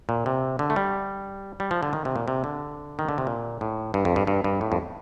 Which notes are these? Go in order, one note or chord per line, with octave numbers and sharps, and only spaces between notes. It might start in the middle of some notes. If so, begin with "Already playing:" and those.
A#2
C3
D3
A3
G3
G3
F3
D3
D#3
C3
A#2
C3
D3
D#3
D3
C3
A#2
A2
G2
F2
G2
G2
G2
A2
F2